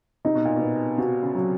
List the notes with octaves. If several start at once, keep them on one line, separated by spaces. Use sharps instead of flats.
C3 D#4
B2
A#2
B2
B3
C3 F#4
C#3
F#3